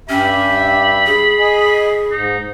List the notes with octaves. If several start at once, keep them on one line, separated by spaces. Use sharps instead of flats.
G2 C#4 G4 E5 B5
G#4
D#5 G#5
G#2 D#4